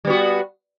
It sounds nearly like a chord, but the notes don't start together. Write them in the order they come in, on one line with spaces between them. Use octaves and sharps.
G3 B3 F#4